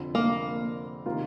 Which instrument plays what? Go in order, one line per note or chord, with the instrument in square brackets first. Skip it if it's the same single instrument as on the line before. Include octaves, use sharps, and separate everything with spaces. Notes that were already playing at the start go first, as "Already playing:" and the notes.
Already playing: [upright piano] F1 F2 D3
[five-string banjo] A#3
[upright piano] C3 D#3 A#3 F4